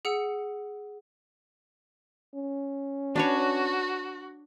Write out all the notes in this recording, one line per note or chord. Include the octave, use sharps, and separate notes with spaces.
G#4 F#5 E6 C#7
C#4
D4 F#4 B4 C#5